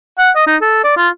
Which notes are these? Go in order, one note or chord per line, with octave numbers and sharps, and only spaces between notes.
F#5
D#5
D#4
A4
D5
F4